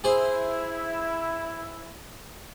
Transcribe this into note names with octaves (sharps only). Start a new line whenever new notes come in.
E4 G#4 C5